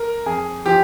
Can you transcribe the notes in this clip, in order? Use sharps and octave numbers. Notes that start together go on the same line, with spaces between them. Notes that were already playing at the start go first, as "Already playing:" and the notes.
Already playing: A#4
F2 G#4
F3 G4